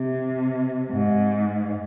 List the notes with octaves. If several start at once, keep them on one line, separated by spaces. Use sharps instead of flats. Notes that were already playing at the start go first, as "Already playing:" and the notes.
Already playing: C3
G#2